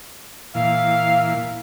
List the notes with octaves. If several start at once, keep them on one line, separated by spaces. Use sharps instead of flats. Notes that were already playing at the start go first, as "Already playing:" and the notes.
A#2 E3 F5